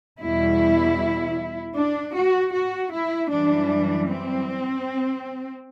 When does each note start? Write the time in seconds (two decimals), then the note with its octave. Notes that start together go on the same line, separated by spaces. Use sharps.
0.20 E2 B2 G3 E4
1.75 D4
2.14 F#4
2.53 F#4
2.92 E4
3.30 F#2 E3 G3 D4
4.08 C4